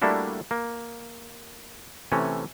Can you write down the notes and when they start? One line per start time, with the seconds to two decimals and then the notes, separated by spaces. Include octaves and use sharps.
0.02 G3 A3 A#3 D4 E4 F#4
0.51 A#3
2.12 C3 E3 A3 C#4